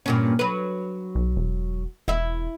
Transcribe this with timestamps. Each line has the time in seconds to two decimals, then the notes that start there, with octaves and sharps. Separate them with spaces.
0.06 G2 A#2 C#4
0.39 F#3 B4
1.15 B1
1.37 E1
2.08 E1 E4 E5